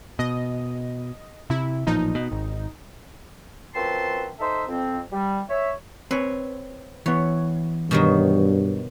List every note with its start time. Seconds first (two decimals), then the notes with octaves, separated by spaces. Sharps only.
0.19 B2 D#5
1.50 C3 E4
1.87 A1 A#2 F3 D#4
2.15 B2
2.32 G#1
3.75 F#2 F3 C4 B4 A5 C6
4.40 D#4 A4 C5 E5
4.69 F2 C4
5.12 G3
5.50 C#5 E5
6.11 C4 B4 C#5
7.06 E3 B3 C#5
7.91 G2 B2 D#3 F#3